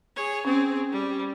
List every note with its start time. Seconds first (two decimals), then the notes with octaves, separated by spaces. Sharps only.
0.16 G#4 C#5
0.45 C4 C#4 G#4
0.92 G3